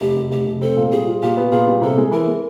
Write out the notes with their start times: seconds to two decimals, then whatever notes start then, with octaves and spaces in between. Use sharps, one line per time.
0.01 F1 G4
0.17 F1
0.31 F1 G4
0.46 F1
0.61 C4 A4
0.77 A#2
0.91 G3 G#4
1.07 F4
1.22 A#2 G4
1.37 B3
1.52 A#2 G#4
1.68 G3
1.81 C3 A4
1.98 G#3
2.11 E3 A#4
2.28 G#3